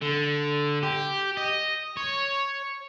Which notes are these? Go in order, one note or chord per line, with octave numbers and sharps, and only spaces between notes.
D3
G4
D#5
C#5